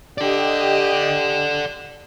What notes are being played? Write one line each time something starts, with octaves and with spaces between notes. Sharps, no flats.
G4 A4 D5 D#5